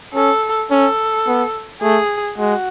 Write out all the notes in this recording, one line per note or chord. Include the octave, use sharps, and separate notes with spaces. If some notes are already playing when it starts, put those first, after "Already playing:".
C#4 A4
C#4 A4
B3
A3 G#4
G#3 F#4